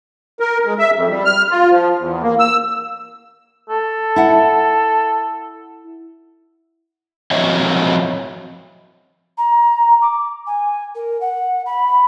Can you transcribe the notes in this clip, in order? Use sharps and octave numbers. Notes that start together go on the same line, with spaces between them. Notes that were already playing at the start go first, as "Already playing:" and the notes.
A#4
G#3
E5
F2
G3
F6
F4
F3
E2
A#3
E6
A4
E4 F#5
F3 F#3 C4 C#5 D#5 E5
A#5
D6
G#5
A#4
F#5
B5